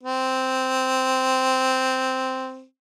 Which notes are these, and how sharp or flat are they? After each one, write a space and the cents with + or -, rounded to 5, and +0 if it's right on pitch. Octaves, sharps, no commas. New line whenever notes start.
C4 -5